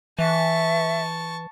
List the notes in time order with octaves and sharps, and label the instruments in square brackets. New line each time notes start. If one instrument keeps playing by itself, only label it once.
[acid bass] E3 [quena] E5 [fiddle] A5 C#6